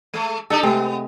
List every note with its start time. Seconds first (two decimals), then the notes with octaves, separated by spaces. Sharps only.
0.14 G#3 A3
0.50 D4 D#4 G4 A4
0.63 C3 G#3 A3 B3